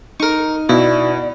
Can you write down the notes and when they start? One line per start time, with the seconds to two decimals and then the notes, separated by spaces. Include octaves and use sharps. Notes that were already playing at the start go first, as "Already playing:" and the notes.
0.20 D#4 A#4 C#6
0.69 B2 E4 D5